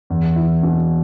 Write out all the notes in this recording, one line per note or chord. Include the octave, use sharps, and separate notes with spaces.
E2
E4
B2